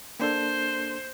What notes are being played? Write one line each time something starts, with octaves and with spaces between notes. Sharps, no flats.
A#3 D4 A4 C5